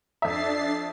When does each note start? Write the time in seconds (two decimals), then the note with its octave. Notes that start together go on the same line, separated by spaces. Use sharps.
0.22 F2 D4 E5 A6 C7